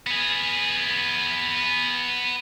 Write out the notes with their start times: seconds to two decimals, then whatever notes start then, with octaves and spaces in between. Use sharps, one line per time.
0.07 B3 G#4